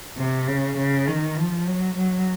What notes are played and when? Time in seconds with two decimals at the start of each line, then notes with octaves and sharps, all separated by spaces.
0.17 C3
0.47 C#3
0.77 C#3
1.07 D#3
1.37 F3
1.67 F#3
1.97 F#3